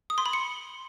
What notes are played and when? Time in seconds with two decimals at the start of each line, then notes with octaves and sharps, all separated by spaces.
0.10 D#6
0.18 C6
0.26 B5
0.33 C#7